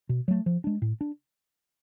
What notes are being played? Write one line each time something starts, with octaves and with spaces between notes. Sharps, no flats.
B2
F#3 A3
F3
G#3 D4
A2
D4